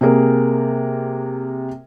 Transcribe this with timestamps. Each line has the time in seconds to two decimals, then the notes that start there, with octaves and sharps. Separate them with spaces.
0.01 C3 A#3 G#4 A#4